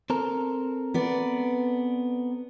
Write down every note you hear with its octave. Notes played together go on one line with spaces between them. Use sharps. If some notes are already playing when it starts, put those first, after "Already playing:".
C4 A4 A#4
B3 D5